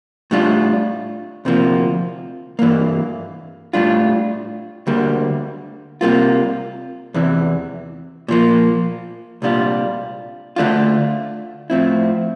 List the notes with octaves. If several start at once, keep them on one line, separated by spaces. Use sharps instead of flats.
A2 G3 D4 F4
D2 C3 F3 A#3
G2 E3 A#3
A2 G3 D4 F4
D2 D3 G3 A#3
C3 G3 A#3 F4
E2 C3 E3
A#2 F3 A#3
C2 A#2 G3 D4 F4
D3 A3 D4 F4
A2 F3 C4 E4